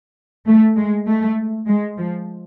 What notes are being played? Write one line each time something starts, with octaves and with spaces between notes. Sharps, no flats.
A3
G#3
A3
G#3
F3